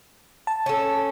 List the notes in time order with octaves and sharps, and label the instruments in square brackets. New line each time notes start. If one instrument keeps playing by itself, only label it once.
[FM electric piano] A5
[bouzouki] C#4 A4